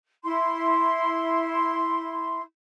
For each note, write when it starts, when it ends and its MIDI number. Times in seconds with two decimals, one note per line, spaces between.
0.23 2.41 64
0.23 2.41 84